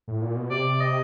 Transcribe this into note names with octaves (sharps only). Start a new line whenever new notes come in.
A2
A#2
B2
C3 D5
D#5